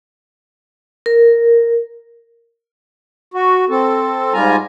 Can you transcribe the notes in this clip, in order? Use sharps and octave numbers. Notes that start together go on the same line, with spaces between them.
A#4
F#4
C4 A4
G#2 G3 F4 G#5 A#5